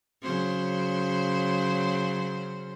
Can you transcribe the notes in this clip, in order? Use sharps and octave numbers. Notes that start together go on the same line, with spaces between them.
C#3 F#3 C5